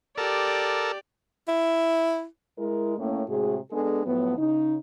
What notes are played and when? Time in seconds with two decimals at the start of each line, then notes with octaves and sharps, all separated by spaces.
0.18 G4 A4 A#4 D5
1.48 E4
2.58 G#3 E4 A#4
2.98 A2 A#3 C#4
3.28 A2 C3 G#3 F#4 G#4
3.72 G#3 B3 D4 G#4 A4
4.06 A2 F3 F#3 B3
4.38 C#3 D#4